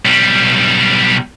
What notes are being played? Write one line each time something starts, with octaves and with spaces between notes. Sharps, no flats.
B1 G3